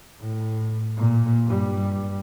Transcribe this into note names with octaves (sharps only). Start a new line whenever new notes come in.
A2
A#2
G2 G3